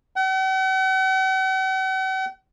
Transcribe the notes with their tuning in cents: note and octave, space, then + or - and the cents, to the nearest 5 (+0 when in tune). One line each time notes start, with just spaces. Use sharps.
F#5 +45